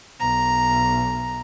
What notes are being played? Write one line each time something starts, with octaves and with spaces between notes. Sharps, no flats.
B1 A#5